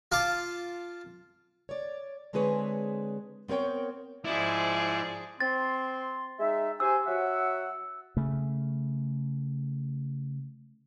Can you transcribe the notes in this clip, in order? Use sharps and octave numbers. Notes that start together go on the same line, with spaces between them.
F4 F5 A5 D6
C#5 D5
D3 G#3 C4 G#4 B4 C#5
B3 C4 A#4 C#5 G5
G#2 F3 E4 G#4 D5
C4 C6 A6
G#3 D#4 E5
G4 C5 G#5 E6
F#3 E5 F#5
C#3 A3